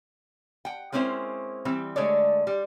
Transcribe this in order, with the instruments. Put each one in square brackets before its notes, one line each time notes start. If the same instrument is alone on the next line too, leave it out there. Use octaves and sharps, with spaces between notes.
[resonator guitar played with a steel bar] F#5 G5
G#3 A#3 C4 C#4 E4 C5
E3 G3 C4
D3 G#3 A3 C#5 D5
G3